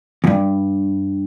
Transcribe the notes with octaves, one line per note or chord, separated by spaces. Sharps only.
E2 G2